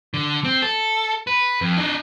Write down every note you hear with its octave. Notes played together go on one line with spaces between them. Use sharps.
D3
C4
A4
B4
F2
D4 D#4